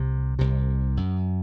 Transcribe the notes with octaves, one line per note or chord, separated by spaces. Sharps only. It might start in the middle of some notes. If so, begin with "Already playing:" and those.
Already playing: C2 C3
C2 C3
F#2